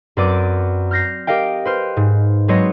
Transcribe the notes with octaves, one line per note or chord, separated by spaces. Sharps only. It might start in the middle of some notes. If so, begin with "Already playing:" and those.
F#2 C4 B4 D5 D6 D#7
F6 G6 A#6 C7
G4 A#4 D#5 F5 G5
B4 C5 F6
G#2
F#3 G#3 C4 B4 C#5 D#5